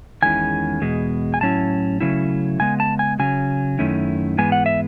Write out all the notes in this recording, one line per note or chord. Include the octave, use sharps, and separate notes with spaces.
E2 D#3 G#3 C#4 E4 G#5
E2 B2 G#3
G#5
A2 F#3 C#4 E4 A5
C#3 F#3 A3 C#4 E4
C#3 G#3 B3 G#5
A5
G#5
C#3 F#3 C#4 G#5
F#2 D#3 A3 C#4 E4
G#2 E3 G#3 B3 G#5
F#5
E5